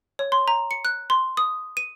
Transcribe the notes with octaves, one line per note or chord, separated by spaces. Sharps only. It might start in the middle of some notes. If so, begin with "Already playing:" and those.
C#5
C6
A#5
C#7
F#6
C6
D#6
D#7